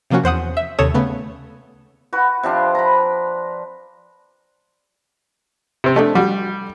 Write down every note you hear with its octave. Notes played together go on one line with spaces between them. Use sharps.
C3 F3 A#3 C#4 F#4
E2 C5 F#5 D#6
E5
D#2 C3 A4 C#5 D#6 E7
C#3 A3 B3
F#4 B4
C3 F3 D4
A#5 B5
C3 C4
A3 D4 A4 D#5
G3 F#4